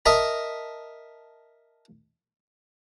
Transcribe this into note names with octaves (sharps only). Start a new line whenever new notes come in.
A#4 D#5 E5 A5 A#5